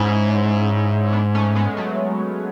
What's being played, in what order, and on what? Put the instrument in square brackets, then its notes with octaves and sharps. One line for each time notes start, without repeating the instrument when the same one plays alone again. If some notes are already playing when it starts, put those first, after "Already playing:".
Already playing: [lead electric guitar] G#2 [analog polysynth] C#4 E4
[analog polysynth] B3 D4
A3 C#4
G#3 B3
F#3 A3